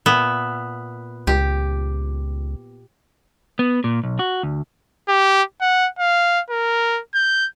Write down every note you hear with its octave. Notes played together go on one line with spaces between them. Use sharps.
A#2 B3 E5
C#2 G4
B3
A#2
B1
F#4
D2
G4
F#5
F5
A#4
G6